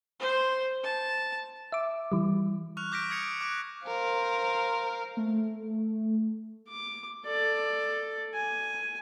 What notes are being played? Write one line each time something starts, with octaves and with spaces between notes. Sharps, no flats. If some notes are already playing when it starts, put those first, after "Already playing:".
C5
A5
E5 D6
E3 G3
C#6 F6 F#6 F7
D6 G6 A#6 B6 D7
D#6 G#6 C#7 F7
C#7 D7
D6 F#6 D7
A#4 C5 F5
A3
D6
A4 D5
G#5